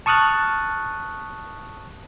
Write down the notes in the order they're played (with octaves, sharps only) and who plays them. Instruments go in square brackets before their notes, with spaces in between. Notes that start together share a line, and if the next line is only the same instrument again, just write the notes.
[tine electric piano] A5 C#6 D#6 F6 F#6 A6